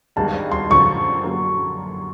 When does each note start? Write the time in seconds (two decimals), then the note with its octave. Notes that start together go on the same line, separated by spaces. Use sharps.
0.16 G#1 G2 D#3 G#3 B3 A5
0.52 C6
0.70 F#2 D3 F3 C#6
1.24 F#2 D3 F#3 A#3